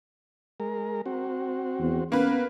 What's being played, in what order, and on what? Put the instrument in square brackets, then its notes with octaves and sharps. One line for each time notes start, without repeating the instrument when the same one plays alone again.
[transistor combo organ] G#3 A#4
C4 F#4
[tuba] E2
[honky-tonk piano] A#3 B4 [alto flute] B3 [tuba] C#4